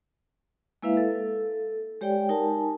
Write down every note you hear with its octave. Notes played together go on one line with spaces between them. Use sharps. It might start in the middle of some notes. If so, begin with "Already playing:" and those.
G#3 A#3 E4 B4 E5 F5
A4
G#3 G4 C#5 D5 G5
D#4 A#4 G#5 A5